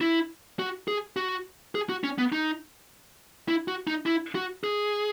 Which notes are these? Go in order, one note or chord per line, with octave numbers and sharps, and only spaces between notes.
E4
F#4
G#4
F#4
G#4
F#4
C#4
B3
D#4
E4
F#4
D#4
E4
F#4
G#4